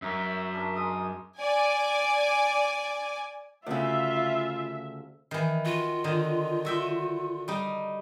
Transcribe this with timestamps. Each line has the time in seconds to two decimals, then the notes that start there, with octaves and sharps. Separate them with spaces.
0.02 F#2 A#4 D#5 E5
0.53 D4 G#4 A#4
0.76 G#3 A#4 D#6
1.38 D5 G#5
3.66 D2 C#3 F4 E5
5.31 D#3 E3
5.65 F4 F#4
6.04 D3 D#3 D#4
6.65 F#4 E5 G5
7.48 G3 D#4